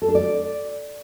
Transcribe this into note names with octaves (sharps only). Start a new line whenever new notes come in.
A4
D4
D5